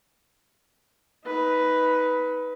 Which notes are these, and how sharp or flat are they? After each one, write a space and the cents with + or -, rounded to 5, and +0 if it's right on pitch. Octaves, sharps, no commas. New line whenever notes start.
D#4 +30 B4 +0